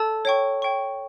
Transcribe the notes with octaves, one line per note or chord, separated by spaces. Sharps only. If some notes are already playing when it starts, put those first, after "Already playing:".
Already playing: A4 D5 A5 E6
C#5 G5 C#6
C#5 G5 C#6